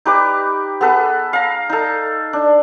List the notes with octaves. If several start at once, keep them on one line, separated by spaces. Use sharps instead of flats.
D#4 G4 B4 D6
B3 G#4 A4 B4
F5 A#5
D#4 A4
D4